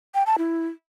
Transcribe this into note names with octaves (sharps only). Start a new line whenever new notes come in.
G5
A5
E4